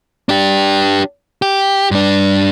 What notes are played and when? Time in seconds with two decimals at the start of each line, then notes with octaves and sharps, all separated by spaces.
0.29 D4 G4
1.42 G4
1.91 G2 D4